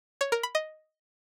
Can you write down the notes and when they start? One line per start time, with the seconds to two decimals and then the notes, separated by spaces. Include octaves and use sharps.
0.21 C#5
0.32 A#4
0.43 B5
0.55 D#5